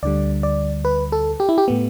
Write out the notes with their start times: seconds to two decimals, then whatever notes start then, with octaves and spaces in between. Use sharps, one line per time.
0.03 D2 D3 G3 D5
0.43 D5
0.85 B4
1.12 A4
1.40 G4
1.49 E4
1.58 G4
1.68 A2 A3 B3